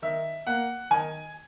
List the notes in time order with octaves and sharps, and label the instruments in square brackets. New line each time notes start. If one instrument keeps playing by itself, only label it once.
[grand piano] D#3 E5
A#3 F#5
D#3 G#5